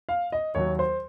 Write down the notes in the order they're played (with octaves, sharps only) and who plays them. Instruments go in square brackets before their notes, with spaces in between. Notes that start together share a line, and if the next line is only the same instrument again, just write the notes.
[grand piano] F5
D#5
D#2 D#3 F#3 C#5
C5